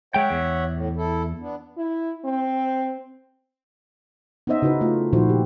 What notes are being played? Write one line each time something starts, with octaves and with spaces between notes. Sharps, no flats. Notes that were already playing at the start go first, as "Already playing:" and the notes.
G#3 C#5 E5 F#5 G5
E2
A2
E4 A4
B3 D4
E4
C4
B3 C#4 D#4 C5 D#5 E5
C#3 D#4 E4 F#4 B4
A3 F4
A#2 D#3 F3 E4 F#4 C5
G4